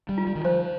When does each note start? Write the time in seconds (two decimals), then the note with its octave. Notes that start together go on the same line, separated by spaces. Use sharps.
0.09 G3
0.18 F4
0.27 G3
0.35 D#3
0.44 F3 C5